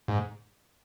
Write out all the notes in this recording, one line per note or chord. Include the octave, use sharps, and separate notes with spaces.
G#2